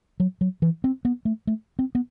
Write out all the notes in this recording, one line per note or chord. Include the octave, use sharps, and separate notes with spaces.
F#3
F#3
E3
C4
B3
A3
A3
C4
B3